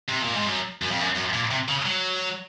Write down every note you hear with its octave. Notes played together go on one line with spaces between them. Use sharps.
C3
A#2
G#2
F#2
F#2
F2
F#2
F#2
A#2
C3
C#3
F#3